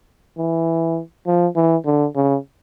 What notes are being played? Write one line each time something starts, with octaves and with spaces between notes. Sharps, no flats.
E3
F3
E3
D3
C#3